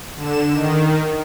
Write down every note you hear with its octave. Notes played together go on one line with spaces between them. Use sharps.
D3 E7
D#3